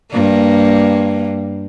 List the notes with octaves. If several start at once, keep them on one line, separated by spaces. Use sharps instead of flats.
G2 A#3